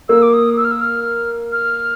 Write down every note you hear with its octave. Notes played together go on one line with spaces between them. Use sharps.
A#3 E6
D6
D#6
E6
F6
E6
F6
F6